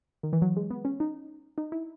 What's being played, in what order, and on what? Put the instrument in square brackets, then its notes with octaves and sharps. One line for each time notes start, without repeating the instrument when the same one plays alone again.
[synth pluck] D#3
E3
F#3
G#3
B3
C#4
D#4
D#4
E4